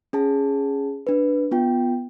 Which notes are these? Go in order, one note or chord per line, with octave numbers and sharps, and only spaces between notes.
C#4 G#4 A5
D4 B4
B3 F4 G5